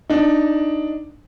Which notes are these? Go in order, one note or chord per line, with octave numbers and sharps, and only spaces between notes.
D4 D#4